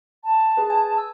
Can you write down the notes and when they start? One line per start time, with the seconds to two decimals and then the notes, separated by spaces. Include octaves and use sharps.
0.24 A5
0.57 G#4 B4
0.70 G#5
0.97 E6